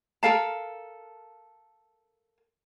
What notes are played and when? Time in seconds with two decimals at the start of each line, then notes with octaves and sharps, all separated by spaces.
0.23 A4 A#4 F5 A5